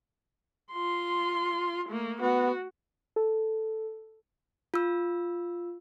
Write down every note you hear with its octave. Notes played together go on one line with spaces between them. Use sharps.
F4 C6
A3 A#3
B3 F#4
A4
F4 E6